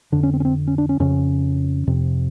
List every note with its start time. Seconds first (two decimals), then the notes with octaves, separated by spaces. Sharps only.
0.12 F2 D3 D4
0.23 C#4
0.34 C4
0.40 C#4
0.45 C4
0.67 C#4
0.78 D4
0.89 C#4
1.00 F2 C#3 C#4
1.87 F2 C3